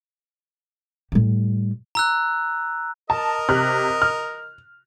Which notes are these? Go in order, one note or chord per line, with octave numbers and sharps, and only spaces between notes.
A2 G3
A#5 E6 F#6
A#4 D#5 A5
C3 F6 F#6
F6